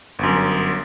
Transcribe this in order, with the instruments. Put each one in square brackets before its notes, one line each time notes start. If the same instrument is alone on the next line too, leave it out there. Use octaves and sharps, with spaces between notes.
[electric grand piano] G1 F#2